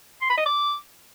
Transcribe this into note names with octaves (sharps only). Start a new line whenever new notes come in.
C6
B5
D#5
D6